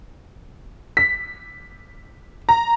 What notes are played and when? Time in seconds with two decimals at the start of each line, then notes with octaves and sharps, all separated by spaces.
0.97 B6
2.49 A#5